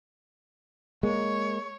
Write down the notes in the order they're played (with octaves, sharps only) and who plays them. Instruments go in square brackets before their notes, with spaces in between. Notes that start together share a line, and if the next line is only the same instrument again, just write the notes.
[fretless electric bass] G#3 A#3 [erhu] C#5